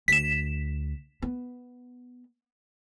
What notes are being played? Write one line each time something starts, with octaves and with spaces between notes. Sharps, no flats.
D2 B6 E7
B3